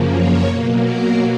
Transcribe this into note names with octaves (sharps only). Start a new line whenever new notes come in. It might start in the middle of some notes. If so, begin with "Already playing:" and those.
Already playing: F#2 C#3 F3 A#3
C#5
B2 F#3 A#3
A#4